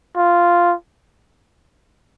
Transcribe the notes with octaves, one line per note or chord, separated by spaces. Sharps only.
F4